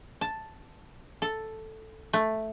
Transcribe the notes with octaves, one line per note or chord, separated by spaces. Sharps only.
A5
A4
A3